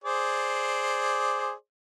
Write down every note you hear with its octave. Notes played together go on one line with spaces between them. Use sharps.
G#4 C5 D5